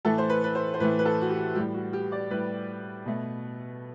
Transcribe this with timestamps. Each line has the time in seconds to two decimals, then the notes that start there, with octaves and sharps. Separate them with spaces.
0.05 A2 E3 A3 A4
0.18 C5
0.30 B4
0.44 B4
0.55 C5
0.74 C5
0.80 A2 E3 A3 B4
0.99 B4
1.05 A4
1.21 F#4
1.30 G4
1.55 A2 G3 G4
1.74 F#4
1.93 G4
2.12 D5
2.31 A2 G3 B4
3.06 B2 A3